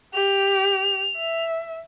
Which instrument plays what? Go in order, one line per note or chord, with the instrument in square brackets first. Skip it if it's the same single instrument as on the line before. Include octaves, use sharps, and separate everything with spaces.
[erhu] G4 [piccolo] F7
[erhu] E5